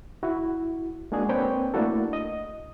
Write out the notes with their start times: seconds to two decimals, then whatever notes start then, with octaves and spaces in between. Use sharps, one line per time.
0.23 E4 F#4
1.12 G#3 A#3 D4 F#4 G#4
1.29 A#3 C4 D4 B4 C#5 G5
1.74 A3 A#3 D4 E4 F#4 A4
2.13 D#5